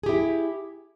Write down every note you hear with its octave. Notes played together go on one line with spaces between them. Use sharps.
E4 G4 G#4